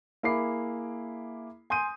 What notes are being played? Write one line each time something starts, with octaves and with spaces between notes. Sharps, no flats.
A#3 E4 G#4 B5 D6 C7
G#5 C6 D#6 G6 D#7